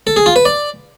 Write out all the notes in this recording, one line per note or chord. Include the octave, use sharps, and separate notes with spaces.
A4
G#4
F4
B4
D5